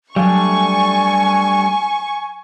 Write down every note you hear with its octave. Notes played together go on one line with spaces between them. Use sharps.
F#3 G3 A3 D4 G#5 C#6